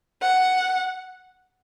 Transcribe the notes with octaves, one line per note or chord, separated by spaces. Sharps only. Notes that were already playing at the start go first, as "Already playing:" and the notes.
F#5